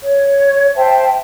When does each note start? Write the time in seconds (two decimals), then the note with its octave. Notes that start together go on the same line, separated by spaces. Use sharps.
0.02 C#5
0.76 C5 E5 G5 A5